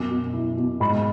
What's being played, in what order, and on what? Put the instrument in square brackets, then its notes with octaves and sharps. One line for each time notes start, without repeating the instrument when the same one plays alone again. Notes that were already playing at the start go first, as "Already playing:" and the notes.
Already playing: [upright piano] F#2 B2 D6
B2
E4
B2
G#2 B5